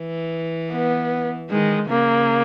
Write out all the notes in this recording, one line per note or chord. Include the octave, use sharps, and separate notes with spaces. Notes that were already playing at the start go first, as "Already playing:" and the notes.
Already playing: E3
B3
D#3 G#3
C#3 A#3